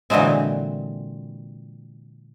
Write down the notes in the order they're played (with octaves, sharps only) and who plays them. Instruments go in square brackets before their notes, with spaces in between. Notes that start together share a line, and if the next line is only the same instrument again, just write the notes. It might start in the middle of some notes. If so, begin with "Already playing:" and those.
[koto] A#2 D3 E3 F#3 G#3 C4